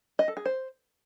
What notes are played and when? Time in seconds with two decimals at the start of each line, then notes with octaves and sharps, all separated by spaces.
0.19 D#5
0.28 A4
0.37 G#4
0.45 C5